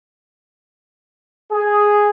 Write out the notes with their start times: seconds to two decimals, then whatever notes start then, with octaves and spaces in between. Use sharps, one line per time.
1.53 G#4